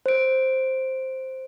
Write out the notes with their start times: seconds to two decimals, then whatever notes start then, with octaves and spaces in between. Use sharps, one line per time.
0.06 C5 D7